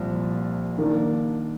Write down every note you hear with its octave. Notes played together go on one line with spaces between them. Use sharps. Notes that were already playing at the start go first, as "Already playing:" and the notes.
Already playing: C2 A#2 F3
D#3 A#3 D4